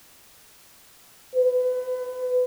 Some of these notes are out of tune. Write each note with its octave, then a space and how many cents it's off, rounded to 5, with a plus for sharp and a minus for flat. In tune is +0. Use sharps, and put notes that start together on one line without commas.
B4 +30